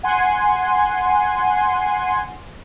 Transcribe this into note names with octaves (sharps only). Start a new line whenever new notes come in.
F#5 G#5 C6